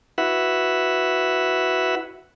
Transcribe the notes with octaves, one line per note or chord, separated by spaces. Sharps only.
E4 F#4 B4 E5 F#5